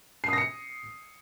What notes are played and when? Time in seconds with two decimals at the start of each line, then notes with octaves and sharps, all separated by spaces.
0.24 C7
0.28 D#6
0.33 A#6
0.38 C#7